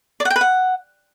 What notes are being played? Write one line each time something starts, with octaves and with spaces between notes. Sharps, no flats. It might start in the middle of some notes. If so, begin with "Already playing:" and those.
D5
F#5
G5
B4
F#5